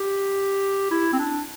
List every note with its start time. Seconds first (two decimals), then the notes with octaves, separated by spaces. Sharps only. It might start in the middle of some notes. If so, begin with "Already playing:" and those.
Already playing: G4
0.91 E4
1.13 C4
1.19 D4